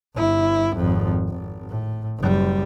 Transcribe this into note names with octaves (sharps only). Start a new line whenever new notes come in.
G1 E4
G#1 F2
G#1
A2
F#1 G3